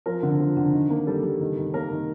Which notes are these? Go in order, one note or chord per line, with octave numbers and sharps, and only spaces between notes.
F3 A#4
D3
F3
D3
D#3
A#3
G3 A4
G3
D#3
D#3
A#3 A#4
D#3